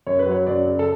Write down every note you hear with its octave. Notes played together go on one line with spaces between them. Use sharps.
F#2 C#5
B4
F#3 C#5
F#2 D5
C#3
A4